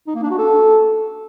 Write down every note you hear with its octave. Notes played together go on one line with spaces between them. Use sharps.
D#4
A#3
D4
F#4
A4